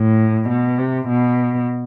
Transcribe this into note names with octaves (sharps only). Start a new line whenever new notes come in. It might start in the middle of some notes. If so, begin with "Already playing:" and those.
Already playing: A2
B2
C3
B2